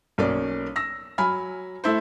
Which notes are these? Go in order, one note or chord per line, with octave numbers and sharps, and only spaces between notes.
B1 A#3 C#4 D5
E6 A#6
F#3 G#5 B5 F6
A3 E4 C5